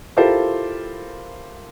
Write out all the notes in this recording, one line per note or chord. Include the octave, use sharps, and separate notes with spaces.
E4 F4 G4 A4 A#4 C5